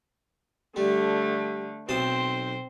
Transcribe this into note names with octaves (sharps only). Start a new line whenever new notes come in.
D3 G3 A3
B1 C4 C5 A5 D#6